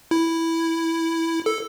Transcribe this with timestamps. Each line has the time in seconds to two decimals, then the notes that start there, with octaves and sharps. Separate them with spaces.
0.11 E4
1.46 A4